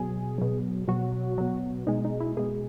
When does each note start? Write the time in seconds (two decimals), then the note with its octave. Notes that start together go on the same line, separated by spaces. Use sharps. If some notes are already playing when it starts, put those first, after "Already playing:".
Already playing: B2 F#3 G#4
0.38 B2 F#3
0.88 B2 F#3 F#4
1.38 B2 F#3
1.87 B2 G#3 D#4
2.05 D#4
2.20 E4
2.37 B2 G#3 G#4